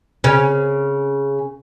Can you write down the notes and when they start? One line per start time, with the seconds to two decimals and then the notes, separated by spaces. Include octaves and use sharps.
0.24 C#3 C#4